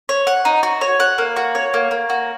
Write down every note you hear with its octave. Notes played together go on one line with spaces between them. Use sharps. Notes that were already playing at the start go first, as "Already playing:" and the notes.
C#5
F#5
D#4
F#4
C#5
F#5
A#3
F#4
C#5
A#3
A#3
F#4